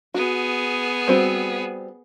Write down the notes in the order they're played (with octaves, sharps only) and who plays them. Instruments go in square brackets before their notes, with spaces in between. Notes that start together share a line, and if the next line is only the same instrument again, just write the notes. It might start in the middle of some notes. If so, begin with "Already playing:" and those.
[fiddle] B3 G#4 [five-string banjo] F#4
[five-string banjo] G3 C4 F#4